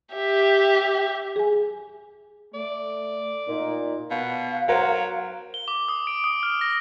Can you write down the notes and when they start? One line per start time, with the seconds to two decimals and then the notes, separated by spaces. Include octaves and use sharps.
0.14 G4 E5
1.36 G#4 G#5
2.54 A3 D5
3.48 A#2 D#4
4.10 B2 F5
4.68 F#3 A#4 C5 F#5
5.54 G7
5.68 D6
5.88 D#6
6.07 D7
6.24 D#6
6.43 F6
6.61 A#6